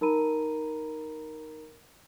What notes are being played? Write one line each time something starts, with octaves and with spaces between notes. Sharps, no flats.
D#4 A#4 A#5 B5 D#7